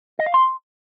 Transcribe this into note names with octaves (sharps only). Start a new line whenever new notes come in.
D#5
F5
C6